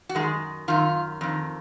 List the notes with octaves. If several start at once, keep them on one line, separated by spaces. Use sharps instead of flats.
F#4
F#2 D#3 G#3 G#4
F#2 D#3 F4
F2 D#3